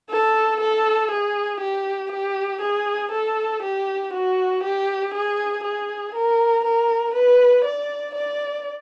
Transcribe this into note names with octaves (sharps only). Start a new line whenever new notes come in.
A4
A4
G#4
G4
G4
G#4
A4
G4
F#4
G4
G#4
G#4
A#4
A#4
B4
D5
D5